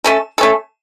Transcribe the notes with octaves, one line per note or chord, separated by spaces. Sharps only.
A3 C#4 A4
A3 C#4 A4